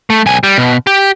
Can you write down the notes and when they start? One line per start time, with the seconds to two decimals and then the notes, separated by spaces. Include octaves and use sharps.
0.10 A3
0.26 B1 G#5
0.44 G3
0.58 B2
0.87 G4